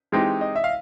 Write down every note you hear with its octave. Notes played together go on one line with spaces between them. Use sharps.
E3 G#3 C4 D#4 G4
D#5
E5
F5